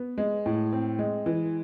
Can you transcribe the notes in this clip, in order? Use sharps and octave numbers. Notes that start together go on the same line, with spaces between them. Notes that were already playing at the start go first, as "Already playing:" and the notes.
Already playing: B3
G#3
A2
C4
G#3
E3